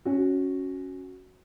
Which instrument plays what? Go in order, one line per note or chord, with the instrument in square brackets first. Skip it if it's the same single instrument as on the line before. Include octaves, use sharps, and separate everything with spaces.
[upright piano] C#4 F#4